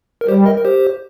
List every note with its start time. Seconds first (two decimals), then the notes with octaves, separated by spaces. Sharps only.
0.21 A#4
0.28 G3 G4 C5
0.45 A#4 D#5
0.57 A#4
0.65 G4 C5